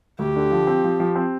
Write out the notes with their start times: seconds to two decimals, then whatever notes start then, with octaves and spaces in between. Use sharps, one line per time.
0.19 D2 G4
0.36 D3
0.52 F3
0.67 C4
0.84 F3
1.00 F3
1.15 C4